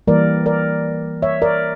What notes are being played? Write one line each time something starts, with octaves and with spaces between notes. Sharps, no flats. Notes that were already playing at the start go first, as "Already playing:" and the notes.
E3 G3 A#3 A#4 D5
A#4 D5
C#5 E5
A#4 D5